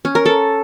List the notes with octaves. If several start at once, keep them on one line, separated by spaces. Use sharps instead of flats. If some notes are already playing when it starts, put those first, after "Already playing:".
C#4
A#4
A4